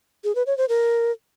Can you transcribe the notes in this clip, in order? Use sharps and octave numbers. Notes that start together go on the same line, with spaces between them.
G#4
B4
C#5
C5
A#4